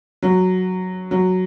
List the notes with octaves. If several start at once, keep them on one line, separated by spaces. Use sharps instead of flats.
F#3
F#3